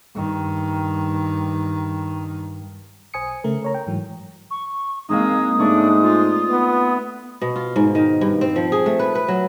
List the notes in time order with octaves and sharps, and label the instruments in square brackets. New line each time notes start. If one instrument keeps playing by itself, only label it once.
[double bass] G2 D#3
[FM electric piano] B1 C5 G#5 D#6 C#7
C#3 A3 A#4
A#4 C#5 A#5
G5
G#2 E3 F#3
[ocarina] C#6
[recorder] G#3 [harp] A#3 C4 D#4 [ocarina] D#6
[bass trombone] G#2 [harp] A3 D5 C#6 [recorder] D4
[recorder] F4
[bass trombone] B3
[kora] B2
F4
G#2
D#3
G2
C4
F3
G#4
A3
B4
B4
F#3